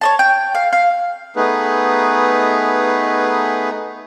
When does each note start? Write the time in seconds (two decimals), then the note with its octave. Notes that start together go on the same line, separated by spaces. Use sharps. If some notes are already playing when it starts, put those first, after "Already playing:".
0.01 C#5 D#5 A5
0.19 G5
0.55 F5
0.73 F5
1.36 A3 B3 D#4 G#4 B4